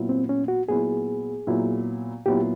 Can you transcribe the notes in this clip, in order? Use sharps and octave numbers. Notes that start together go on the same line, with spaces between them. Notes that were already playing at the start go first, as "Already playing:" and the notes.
Already playing: A#2 F#3 B3 E4
C4
C#4
F#4
A#2 F#3 B3 E4 G#4
A#2 F#3 B3 E4
A#2 F#3 B3 E4 G4